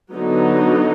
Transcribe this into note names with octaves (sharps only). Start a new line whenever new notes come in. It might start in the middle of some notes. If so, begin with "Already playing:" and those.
D3 F#3 B3 D#4 F#4